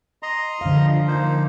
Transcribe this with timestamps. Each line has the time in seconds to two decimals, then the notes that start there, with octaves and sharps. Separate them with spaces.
0.23 D#5 A#5 C6
0.61 D3 F3 F5
1.08 A#3 D#4 C5